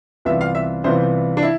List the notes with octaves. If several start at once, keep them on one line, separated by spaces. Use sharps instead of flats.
C2 C3 E3 B3 F4 E5
F5
E5
C2 C3 E3 B3 F4 C5
D4
E4